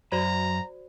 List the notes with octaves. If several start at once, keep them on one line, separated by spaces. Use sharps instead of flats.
F#2 F#4 C5 D5 A#5